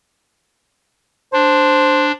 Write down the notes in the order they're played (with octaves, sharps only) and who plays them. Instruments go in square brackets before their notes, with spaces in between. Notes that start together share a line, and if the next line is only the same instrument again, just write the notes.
[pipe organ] D4 [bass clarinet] C5